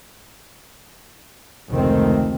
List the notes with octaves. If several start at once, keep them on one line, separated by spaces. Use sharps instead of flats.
F1 C#2 D#3 A3 C4